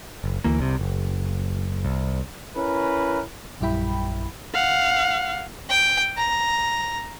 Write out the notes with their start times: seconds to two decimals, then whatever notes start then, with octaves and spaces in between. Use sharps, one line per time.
0.24 F#1
0.44 D2 E3 A#3
0.59 C2 C3
0.79 F#1
1.85 C2
2.56 C#4 E4 A#4 B4
3.61 A#1 F#2 G3 E4 G5 B5
4.54 F5 F#5
5.69 G5
6.17 A#5